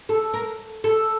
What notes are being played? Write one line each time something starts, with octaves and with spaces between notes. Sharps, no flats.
A4
A#4
A4